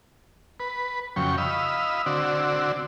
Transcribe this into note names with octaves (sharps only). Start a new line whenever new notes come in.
B4
F2 C#3 F#3 G5 C#6
D#5 F5 B5 E6
D3 C4 F#4 D5 E6